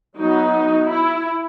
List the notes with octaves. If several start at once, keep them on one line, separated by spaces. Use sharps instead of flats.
F#3 B3 D#4
E4